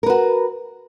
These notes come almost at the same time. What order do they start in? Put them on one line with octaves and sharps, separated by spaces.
A#4 B4 F#4